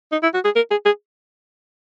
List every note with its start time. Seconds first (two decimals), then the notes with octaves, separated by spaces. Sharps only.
0.12 D#4
0.23 E4
0.34 F#4
0.44 G#4
0.56 A#4
0.71 G#4
0.86 G#4